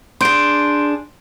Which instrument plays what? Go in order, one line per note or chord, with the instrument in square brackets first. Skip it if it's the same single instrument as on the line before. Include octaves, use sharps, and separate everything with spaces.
[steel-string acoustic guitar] D4 G#4 [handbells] C6 G6 D7